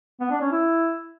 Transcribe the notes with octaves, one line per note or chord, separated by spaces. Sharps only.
B3
D4
C#4
E4